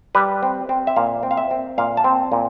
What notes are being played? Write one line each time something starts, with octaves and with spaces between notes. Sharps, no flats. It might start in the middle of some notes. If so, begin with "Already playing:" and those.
G3 B4
C4
C4
E5
A#2 F5
C4
F5
E5
C4
A#2 F5
A5
C4
A#2